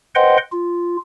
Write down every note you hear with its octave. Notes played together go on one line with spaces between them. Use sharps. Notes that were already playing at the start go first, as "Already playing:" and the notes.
B4 C5 D#5 F#5 G5 C6
F4